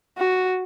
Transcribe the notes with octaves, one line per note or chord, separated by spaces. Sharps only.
F#4